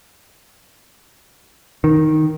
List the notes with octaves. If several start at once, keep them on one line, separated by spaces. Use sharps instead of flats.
D#3